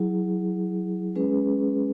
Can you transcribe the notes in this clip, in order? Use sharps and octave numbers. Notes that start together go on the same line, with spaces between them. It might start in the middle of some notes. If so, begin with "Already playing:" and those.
Already playing: F#3 E4 G#4
G#3 C#4 G#4 B4